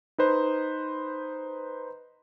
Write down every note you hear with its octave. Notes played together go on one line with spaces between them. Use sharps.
D#4 B4 C5